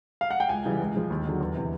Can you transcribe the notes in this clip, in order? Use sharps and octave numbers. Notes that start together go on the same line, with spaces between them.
F5
F#5
G5
C#2 G#5
C#3 E3 G3
C#2
C#3 F3
D#2
D3 F#3
E2
C3 E3